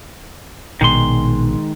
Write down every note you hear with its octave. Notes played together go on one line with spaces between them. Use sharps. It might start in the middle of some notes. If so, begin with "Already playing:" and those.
A#1 B2 D#3 G#3 C6